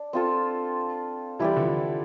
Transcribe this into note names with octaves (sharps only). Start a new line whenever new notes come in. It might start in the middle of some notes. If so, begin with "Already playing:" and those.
Already playing: D4
C4 F4 A4
E3 G3 E4 G4 D5
D3 F3